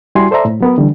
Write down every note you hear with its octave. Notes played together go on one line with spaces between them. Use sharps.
G3 E4 F#4 G#5 C6
A4 C5 D5 E5 A#5
A2
F#3 B3 A#4
D3 E3 G3